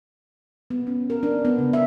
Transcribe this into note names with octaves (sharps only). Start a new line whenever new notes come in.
B3
C#4
A#4
D4
B3
C#3
E5